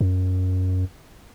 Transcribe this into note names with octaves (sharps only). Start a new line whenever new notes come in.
F#2